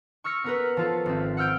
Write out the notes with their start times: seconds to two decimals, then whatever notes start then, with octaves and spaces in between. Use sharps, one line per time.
0.24 C#6 E6 F6 A#6 C#7
0.44 B3 A#4 B4
0.77 F3 F4 A4
1.06 G#1 C4
1.37 F#5 E6 F6 G6 D7